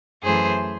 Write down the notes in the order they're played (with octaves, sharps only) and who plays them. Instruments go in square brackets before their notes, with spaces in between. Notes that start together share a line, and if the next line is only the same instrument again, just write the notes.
[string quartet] F#2 E3 A3 G#4 C5